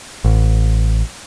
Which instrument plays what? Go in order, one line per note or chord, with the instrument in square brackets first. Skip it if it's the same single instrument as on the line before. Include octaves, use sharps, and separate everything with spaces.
[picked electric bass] A1